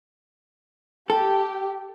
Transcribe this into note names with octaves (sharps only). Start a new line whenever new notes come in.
G4 A4